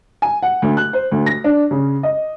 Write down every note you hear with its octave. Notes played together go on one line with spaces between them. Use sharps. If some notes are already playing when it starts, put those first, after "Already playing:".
G#5
F#5
D2
F#6
C5
D2
A#6
D4
C#3
D#5